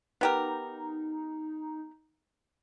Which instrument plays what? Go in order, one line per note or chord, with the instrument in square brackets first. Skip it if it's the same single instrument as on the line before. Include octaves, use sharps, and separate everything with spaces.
[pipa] B3 G4 A#4 [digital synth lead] D#4